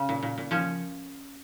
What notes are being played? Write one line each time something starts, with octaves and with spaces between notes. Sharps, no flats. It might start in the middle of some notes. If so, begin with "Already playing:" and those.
Already playing: C#3
A#2
A#2
A#2
F3 C#4